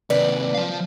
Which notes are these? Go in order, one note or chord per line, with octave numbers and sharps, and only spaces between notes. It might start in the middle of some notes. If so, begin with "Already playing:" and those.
D#2 C3 B4 D5
F3 F5